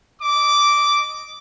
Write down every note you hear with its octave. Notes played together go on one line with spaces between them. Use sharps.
D#5 D6